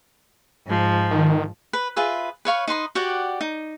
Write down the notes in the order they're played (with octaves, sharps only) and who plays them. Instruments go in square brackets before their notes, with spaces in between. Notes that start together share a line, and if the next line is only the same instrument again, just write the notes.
[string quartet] G#2 F3
[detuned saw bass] D#3
[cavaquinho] B4
F4 G#4 B4 E5
B4 C#5 F5 C#6
D#4 B4 C6 D#6
F#4 G4 D5 F#5
D#4